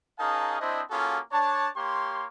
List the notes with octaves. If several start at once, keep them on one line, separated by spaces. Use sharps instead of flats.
C#4 D#4 G#4 A#4 F5 A5
C4 D4 E4 C5 D#5
A#3 C#4 F4 F#4 G#4 A4
D4 C#5 A5
A#3 G4 C#5 C6